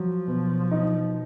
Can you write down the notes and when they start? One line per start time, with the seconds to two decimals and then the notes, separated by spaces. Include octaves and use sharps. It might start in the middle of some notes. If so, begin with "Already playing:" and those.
Already playing: F3 F#3
0.28 B2
0.71 D#4